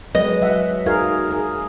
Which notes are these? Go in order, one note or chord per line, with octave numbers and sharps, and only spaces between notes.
F#3 G#3 B4 D#5
F#3 E5 F#5
D#4 F#4 G#4 A#4 F5 G#6
G#4 A#4